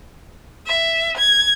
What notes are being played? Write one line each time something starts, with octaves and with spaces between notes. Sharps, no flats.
E5
G#6